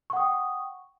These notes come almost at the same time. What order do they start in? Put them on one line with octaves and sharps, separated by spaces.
C#6 F#5 D#6 G5